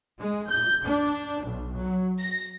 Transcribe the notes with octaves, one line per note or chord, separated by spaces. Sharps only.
G#3
G6
D4
B1
F#3
A#6